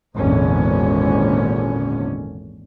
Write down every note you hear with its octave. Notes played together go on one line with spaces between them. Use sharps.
G#1 E2 A#2 D3 C#4